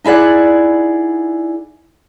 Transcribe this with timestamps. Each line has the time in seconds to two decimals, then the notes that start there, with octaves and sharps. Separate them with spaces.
0.04 D#4 E4 G#4 D5 F#5